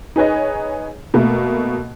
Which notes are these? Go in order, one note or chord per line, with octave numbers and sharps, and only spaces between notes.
D#4 G#4 B4 C#5 D#5
B2 A3 A#3